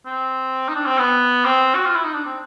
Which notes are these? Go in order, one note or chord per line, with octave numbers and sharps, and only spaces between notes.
C4
D#4
D4
C4
B3
C4
F#4
F4
E4
D#4
D4
C4